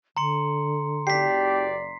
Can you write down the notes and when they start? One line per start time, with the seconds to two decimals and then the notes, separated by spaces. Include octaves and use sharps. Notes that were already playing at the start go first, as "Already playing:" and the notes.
0.17 D3 A#5 C6 C#7
1.07 F#1 G4 D5 B6 C7